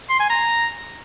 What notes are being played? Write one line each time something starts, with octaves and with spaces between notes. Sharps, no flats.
C6
G#5
A#5